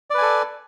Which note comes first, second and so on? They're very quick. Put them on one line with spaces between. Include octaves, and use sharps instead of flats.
D5 B4 G#5 A4